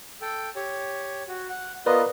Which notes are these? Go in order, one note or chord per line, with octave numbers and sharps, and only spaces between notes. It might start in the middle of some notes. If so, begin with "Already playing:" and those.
A4 G5
G4 C#5
F#4
F#5
B3 F4 A#4 B4 D5 D#5